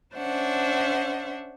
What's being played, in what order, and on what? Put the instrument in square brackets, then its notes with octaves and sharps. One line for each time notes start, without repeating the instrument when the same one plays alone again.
[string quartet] C#4 D4 C5 E5 F#5